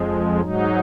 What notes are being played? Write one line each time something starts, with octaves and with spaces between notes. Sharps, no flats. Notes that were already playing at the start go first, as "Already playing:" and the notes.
Already playing: F2 F3 G#3
G#2 F#3 D#4